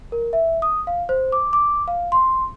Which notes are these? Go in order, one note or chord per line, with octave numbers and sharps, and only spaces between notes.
A#4
E5
D#6
F5
C5
D6
D6
F5
C6